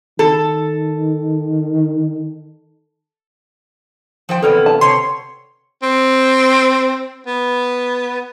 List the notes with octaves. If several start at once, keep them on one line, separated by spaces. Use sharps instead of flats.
D#3 A4
F3 C5 G5
E2 C3 B3 A4 B4 D5
A5
C3 C#5 C6
C4
B3